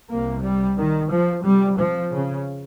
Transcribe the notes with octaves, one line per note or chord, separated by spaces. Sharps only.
C2 C3 A#3
G3
D#3
F3
F2 C3 G3
F3
C#3